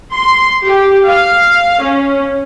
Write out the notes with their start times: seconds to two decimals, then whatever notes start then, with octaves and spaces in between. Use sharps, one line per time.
0.13 C6
0.65 G4
1.07 F5
1.82 C#4